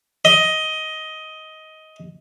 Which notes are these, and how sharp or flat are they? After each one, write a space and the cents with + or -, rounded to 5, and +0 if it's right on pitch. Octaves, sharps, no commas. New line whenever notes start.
D#5 +15